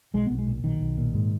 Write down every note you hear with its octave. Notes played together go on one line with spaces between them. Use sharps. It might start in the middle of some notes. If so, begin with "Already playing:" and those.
B1 G#3
B1 B3
G#3
A#2
B1 D#3
B1
A#2
G#2